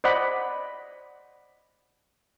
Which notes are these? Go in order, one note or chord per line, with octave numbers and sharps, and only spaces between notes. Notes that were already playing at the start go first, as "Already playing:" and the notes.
C5 D5 D#5 F#5 B5